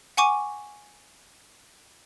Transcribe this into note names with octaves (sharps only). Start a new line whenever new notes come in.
F#5 G#5 C#6 D6 D#7